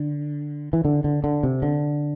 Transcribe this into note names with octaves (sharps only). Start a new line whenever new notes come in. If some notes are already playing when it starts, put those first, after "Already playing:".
Already playing: D3
E3
D3
D3
D3
C3
D3